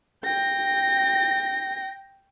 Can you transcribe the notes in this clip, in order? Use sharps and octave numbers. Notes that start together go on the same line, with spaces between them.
G5 A#6